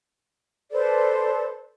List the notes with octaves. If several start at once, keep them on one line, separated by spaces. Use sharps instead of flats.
A4 B4 C5 D5